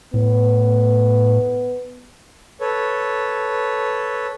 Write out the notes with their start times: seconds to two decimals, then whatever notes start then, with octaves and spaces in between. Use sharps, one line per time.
0.14 A2 B3
2.61 A4 B4 C#5